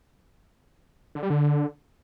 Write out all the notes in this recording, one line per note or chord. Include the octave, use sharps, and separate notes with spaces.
D3
G3
D3